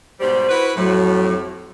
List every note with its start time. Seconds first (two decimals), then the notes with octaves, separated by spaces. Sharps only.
0.20 G#2 B2 G3 C5
0.49 E4 F#4 B4
0.76 F2 A2 F#3